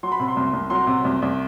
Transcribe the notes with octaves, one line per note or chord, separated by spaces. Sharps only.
F#3 C6
B5
C3
C6
C2
C2
F#3 C6
C3
C2
C2